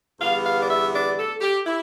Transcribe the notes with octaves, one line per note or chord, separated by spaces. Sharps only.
E2 D3 G3 B3 F5
F5
D5
E5
D5
A4
G4
E4